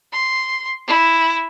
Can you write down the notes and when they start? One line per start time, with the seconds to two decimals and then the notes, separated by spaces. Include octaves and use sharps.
0.12 C6
0.87 E4